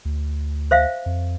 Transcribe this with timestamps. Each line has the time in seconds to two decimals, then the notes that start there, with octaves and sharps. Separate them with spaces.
0.05 D2
0.71 C5 E5 F5
1.06 F2